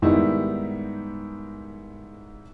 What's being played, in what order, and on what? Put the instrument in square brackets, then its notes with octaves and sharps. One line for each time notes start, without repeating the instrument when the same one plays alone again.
[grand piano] G#2 D#3 G3 B3 D#4 E4